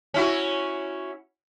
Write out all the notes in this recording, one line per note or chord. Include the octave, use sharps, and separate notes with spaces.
C#4 E4 F#4